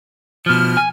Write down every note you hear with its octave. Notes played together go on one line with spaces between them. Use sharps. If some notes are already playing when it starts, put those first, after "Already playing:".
B2 F3 F6
G#5